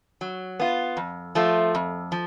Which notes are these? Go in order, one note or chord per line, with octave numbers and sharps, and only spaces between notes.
F#3
B3 F4
F2
F3 A3 F4
F2
F3